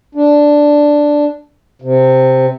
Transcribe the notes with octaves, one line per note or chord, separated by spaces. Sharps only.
D4
C3